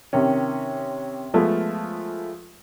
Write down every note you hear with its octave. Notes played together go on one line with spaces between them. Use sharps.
C3 D#3 C#4
F3 G#3 A3 B3